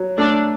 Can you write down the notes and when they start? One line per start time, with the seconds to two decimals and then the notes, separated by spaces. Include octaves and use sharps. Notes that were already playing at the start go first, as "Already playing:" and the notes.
Already playing: F#3
0.17 A3 D4